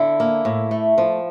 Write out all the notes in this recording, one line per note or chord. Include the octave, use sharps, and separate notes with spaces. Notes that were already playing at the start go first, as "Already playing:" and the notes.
Already playing: D3 E4
A#3
A2
A3
F3